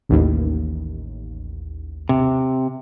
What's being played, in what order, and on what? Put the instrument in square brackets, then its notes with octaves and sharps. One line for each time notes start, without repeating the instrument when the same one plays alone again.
[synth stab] A1 D#2
[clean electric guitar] C3